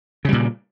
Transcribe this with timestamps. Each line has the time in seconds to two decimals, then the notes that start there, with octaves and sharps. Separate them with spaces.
0.25 C#3
0.29 G3
0.32 A#2